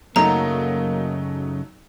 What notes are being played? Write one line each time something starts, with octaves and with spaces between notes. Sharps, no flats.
F#2 C#3 F#3 A3 A#3 D#4 A#5